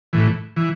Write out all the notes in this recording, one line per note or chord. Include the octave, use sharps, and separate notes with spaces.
A2 E3
E3